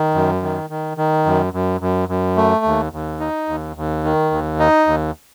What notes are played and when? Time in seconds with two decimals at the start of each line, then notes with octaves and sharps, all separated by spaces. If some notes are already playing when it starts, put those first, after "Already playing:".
Already playing: D#3
0.14 F#2
0.43 D#3
0.70 D#3
0.97 D#3
1.26 F#2
1.53 F#2
1.81 F#2
2.09 F#2
2.37 A3
2.65 D#2
2.93 D#2
3.20 D#4
3.48 D#2
3.76 D#2
4.04 D#3
4.32 D#2
4.59 D#4
4.87 D#2